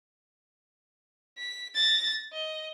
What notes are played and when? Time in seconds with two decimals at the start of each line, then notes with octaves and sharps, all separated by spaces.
1.38 B6
1.75 A6 A#6
2.33 D#5